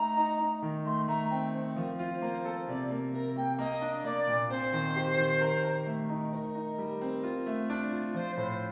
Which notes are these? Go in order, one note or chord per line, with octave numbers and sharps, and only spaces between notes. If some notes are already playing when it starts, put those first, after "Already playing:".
Already playing: A3 D#4 A#5
D#4
D#4
D#3
A3 C6
A3 A#5
C4 G5
C4
F3 A#4
F4 C5
A#3 C5
A4 C5
C3 D5
A#3
C3 A#4
A#3 G5
A#3 D#5
D4
A#3 D5
A#2
C4 C5
D#3
G4
D#3
A#4
A#4
A3
D#4
D#4 A#4 C5
D#4
G3
C4
F4
A3
D4
F4
F3 C5
A2 C5